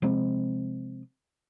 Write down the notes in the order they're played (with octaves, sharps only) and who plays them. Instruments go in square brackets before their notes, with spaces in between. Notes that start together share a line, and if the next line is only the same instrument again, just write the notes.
[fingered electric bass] C3 F3 G#3 C4